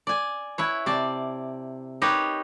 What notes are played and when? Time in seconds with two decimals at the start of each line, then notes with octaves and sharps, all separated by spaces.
0.07 D5 G#5
0.58 E4 B4 C#5
0.86 C3 D5 A5
2.02 D#4 G4 A#4 B4 C#5